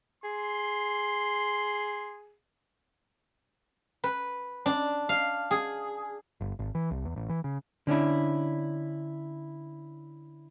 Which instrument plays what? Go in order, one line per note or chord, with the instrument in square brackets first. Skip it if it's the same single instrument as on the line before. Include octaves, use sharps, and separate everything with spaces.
[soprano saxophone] G#4 [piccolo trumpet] C6
[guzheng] B4
D4
F5
G#4
[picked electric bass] G1
G#1
E3
C2
E2
A1
E3
C#3
[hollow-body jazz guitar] D3 C#4 D4 E4